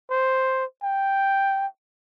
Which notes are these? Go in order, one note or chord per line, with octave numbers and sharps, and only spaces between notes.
C5
G5